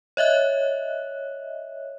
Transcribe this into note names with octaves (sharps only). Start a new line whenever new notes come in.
C#5 D#5 E5 F#6